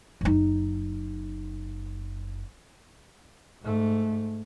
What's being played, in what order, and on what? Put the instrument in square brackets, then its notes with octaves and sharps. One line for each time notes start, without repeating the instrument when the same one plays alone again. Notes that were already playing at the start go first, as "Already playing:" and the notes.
[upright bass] F#1 D#4
[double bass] G#2 A3